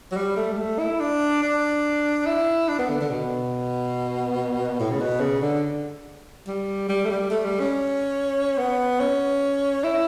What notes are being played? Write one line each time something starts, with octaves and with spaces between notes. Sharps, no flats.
F#3
G3
A3
G3
A3
E4
D4
D4
E4
D4
B3
D3
D3
B2
A2
C#3
B2
C#3
D3
G3
G3
A3
G3
A3
G3
C#4
B3
C#4
E4